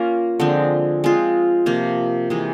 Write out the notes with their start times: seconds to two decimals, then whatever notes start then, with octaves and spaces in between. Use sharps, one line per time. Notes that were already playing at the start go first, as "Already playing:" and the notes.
Already playing: A#3 C#4 F4 A#4
0.40 D3 F3 G#3 C4
1.04 G#3 C4 F4
1.66 C3 F3 A#3
2.30 C3 E3 G#3